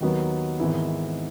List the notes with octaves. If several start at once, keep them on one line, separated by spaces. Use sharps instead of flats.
D#2 D#3 F#3 B3
G#1 G#2 E3 B3 E4